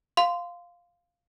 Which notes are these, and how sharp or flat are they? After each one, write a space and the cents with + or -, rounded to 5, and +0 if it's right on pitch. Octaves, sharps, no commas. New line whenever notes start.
F5 +0 C6 -20